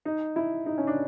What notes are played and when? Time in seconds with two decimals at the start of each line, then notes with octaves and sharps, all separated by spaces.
0.05 D#4
0.36 E4
0.66 D#4
0.78 C#4
0.87 D4